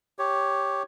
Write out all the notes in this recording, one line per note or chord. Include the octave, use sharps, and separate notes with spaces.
G4 C#5